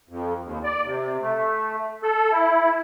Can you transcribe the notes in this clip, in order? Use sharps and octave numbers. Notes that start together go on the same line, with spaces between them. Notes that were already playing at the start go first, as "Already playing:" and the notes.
F2
D#2
D5
C3
A3
A4
E4